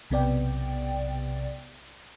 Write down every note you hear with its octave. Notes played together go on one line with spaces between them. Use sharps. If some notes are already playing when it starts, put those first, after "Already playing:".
B1 C3 B3 D5 G5